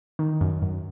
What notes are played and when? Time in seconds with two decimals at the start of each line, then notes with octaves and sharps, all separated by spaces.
0.19 D#3
0.41 F#2
0.62 F#2